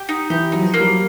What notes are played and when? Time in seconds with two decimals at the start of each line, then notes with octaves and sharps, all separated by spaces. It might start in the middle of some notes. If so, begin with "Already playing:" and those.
Already playing: G4
0.09 D#4
0.30 E3 G4
0.52 F#3 D#4
0.62 F3
0.74 A#3
0.80 G3
0.88 F#3